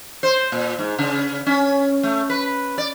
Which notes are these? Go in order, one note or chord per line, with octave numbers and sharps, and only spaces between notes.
C5
A#2
G#2
C#3
C#4
A3
B4
D5